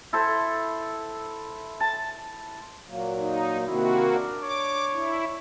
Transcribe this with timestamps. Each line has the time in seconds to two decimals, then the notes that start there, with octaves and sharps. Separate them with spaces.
0.13 E4 A4 C5
1.80 A5
2.88 A#2 F#3 A#3
3.18 D#4
3.67 C3 D#3 A#3 C4 E4 F#4
4.10 D4 A#4
4.43 C#5 D6
4.94 E4